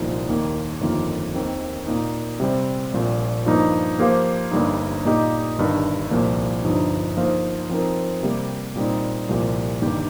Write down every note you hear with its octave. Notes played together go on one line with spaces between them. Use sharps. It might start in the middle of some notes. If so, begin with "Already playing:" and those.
Already playing: C2 A#2 F3 D#4 C5
D#2 D#3 A#3
G1 F2 D#3 A#3 F4
D#2 D#3 C4
A#2 A#3 D#4
C3 G3 C4
A#1 A#2 G3
G2 F3 A#3 D#4
F3 A#3 G4 C5 F5
G1 G2 G3 A#3 D#4
A#2 A#3 D#4 G4 D#5
G1 G2 D#3
C2 A#2 F3 A#3
G1 G2 F3 D#4
F3 A#3 D#4 C5 F5
F3 C4 D#4 A#4
C3 G3 A#3 G4
A#2 G3 C4 D#4
C2 A#2 F3 A#3 G4
G1 G2 D#3 A#3 G4